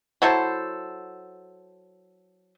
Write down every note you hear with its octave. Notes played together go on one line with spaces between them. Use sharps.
F#3 E4 A4 C5